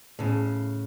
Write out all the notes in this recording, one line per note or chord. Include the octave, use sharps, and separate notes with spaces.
A2 C#3